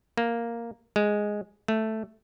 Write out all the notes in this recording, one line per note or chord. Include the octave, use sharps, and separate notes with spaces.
A#3
G#3
A3